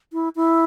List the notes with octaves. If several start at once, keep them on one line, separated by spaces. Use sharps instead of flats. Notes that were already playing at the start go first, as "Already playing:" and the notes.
E4
E4